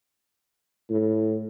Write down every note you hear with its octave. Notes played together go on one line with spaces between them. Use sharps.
A2